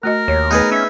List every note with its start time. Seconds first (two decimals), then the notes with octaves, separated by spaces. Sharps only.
0.03 A3 F#4 A#4 D#5
0.28 D#2 C#5
0.51 A3 B3 D#4 G#4 B4
0.72 C#4 E5